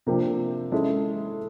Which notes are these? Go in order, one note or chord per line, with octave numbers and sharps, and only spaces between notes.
C3 F3 A#3 D4 G4
G#3 C#4 E4 A4